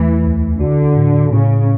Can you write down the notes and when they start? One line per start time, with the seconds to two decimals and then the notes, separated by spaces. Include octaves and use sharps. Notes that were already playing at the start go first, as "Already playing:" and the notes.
Already playing: E2 E3 A3
0.25 D2
0.60 D3 F#4
0.97 A2
1.33 A2 C#3